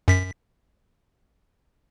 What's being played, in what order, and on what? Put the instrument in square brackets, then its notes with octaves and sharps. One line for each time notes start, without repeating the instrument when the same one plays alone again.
[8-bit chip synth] F#2 B6